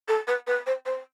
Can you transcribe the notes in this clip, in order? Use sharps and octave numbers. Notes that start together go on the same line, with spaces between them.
A4
B4
B4
C5
C5